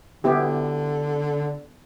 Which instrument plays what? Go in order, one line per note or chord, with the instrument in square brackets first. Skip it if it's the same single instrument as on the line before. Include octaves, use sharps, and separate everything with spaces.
[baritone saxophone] D3 [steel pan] B3 E4 G4